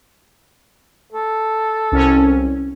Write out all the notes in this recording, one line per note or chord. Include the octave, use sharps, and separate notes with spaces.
A4
C2 C#4